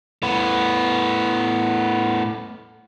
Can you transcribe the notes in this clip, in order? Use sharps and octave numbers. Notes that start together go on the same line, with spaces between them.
A2 B3